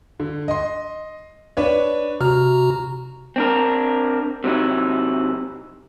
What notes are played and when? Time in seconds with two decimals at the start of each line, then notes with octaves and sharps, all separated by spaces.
0.20 D3
0.48 D#5 C6
1.57 D4 B4 C#5
2.21 C3 F#4 A#5 F6
3.36 C4 D4 A#4
4.44 C3 F#3 D#4 E4